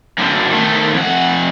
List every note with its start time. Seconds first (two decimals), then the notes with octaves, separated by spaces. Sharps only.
0.18 F#2 D3
0.51 D#3 A3
0.94 F2 F#5